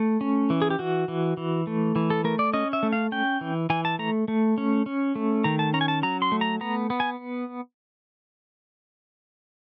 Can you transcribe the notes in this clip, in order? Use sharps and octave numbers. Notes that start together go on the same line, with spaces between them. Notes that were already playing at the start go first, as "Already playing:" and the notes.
Already playing: A3
C#4
E3
G#4
G4
E3 F#4
E3
E3
A3
E3
A4
A3 A#4
D5
C#4 D#5
E5
A3
F5
C#4 G5
E3
E3 G#5
A5
A3 A#5
A3
C#4
C#4
A3
D#3 A#5
A5
C#4 A#5
G#5
A5
F#3 A#5
C6
A3
A#5
B3 A#5
B3
G#5